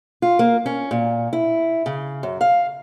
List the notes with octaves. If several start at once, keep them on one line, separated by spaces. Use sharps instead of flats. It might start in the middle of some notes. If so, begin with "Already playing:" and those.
F4
A#3
C#4
A#2
E4
C#3
F#2
F5